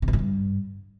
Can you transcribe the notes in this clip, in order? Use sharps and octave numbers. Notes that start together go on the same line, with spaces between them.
C3
B2
A#2
G2